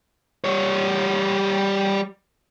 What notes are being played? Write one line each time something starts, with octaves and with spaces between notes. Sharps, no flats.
G3 C#5